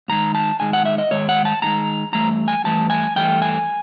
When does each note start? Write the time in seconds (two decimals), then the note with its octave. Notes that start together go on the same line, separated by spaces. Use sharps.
0.08 G#2 D#3 G#3 A#5
0.35 A5
0.60 G#2 D#3 G#3 G#5
0.73 F#5
0.85 E5
0.98 D#5
1.11 G#2 D#3 G#3 C#5
1.29 F#5
1.45 A5
1.62 G#2 D#3 G#3 A#5
2.13 G2 E3 A3 A#5
2.48 G#5
2.64 G2 E3 A3 A5
2.90 G#5
3.16 G2 E3 A3 G5
3.42 G#5